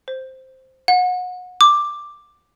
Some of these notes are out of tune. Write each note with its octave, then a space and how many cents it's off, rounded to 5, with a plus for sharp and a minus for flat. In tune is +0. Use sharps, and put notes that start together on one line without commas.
C5 +0
F#5 -30
D6 +5